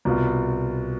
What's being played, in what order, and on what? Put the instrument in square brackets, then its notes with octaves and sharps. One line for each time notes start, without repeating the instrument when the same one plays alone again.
[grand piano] C2 B2 B3 F4